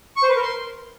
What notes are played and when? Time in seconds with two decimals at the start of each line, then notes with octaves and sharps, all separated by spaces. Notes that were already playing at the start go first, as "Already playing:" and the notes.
0.16 C#6
0.23 C5
0.29 B4
0.36 A#4
0.42 C6